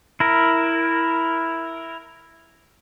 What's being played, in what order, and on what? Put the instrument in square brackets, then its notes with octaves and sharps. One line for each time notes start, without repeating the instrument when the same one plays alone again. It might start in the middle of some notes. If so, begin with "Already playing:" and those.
[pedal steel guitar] E4 A#4